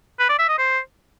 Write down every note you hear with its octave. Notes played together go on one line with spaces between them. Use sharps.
B4
D5
E5
D#5
C5